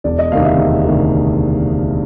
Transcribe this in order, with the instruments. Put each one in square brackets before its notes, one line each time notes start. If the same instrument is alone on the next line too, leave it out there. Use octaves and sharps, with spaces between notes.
[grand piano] E1 D5
D#5
D2 C3 D#3 F5
E5
E1
D2 C3 D#3